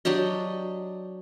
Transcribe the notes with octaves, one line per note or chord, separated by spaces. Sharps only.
F#3 D4 G4 D#5